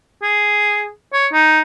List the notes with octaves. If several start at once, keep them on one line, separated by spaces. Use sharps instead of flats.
G#4
C#5
D#4